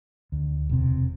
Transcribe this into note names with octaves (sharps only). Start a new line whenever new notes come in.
D2
E1 C3